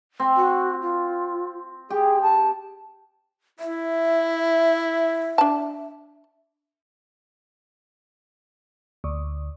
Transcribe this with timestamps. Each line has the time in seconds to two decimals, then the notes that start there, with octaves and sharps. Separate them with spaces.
0.20 C4
0.36 F#4
0.82 F4
1.90 G4 G#4
2.22 A5
3.60 E4 E5
5.38 D4 A5
9.04 D2